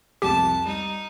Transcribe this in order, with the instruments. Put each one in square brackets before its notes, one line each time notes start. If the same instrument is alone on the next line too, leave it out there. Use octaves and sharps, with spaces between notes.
[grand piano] C2 F2 [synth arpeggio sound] G4 [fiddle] A5
[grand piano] G3 [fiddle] D#4